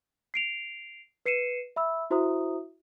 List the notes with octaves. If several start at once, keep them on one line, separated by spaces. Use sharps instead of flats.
C7 D7 F7
B4 C7 C#7 D#7 E7
E5 B5 E6
E4 F#4 C5 E5 A#5 D#6